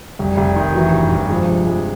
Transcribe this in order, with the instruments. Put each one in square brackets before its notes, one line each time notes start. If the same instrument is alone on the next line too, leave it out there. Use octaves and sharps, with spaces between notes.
[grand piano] F1 [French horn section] G3
[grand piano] F1
D#3
[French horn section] E3 [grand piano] F#3
[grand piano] G2
G2
[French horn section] F3 [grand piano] G#3
[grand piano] C3
G#3